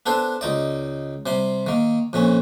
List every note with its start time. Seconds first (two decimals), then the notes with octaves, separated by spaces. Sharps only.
0.06 B3 D4 A4 C5
0.41 C#2 D#4 D5
1.26 C3 G3 C6
1.67 D#3 A#3
2.13 F2 A#2 C#4